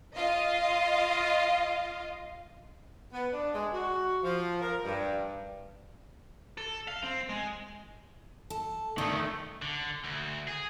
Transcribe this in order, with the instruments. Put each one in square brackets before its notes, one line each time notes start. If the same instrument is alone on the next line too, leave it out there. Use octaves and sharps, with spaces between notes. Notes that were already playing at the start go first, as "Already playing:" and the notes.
[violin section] F4 D#5 F5
[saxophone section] B3
D4
G#3
F#4
F3
A#4
G2
[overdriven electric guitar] A4
F5
C4
G#3
[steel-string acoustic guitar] A4
[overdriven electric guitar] D#3 A3 [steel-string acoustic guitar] D4
[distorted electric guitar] D3
D2
G#4